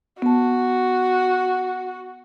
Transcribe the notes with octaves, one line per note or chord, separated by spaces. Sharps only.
B3 F#4 A5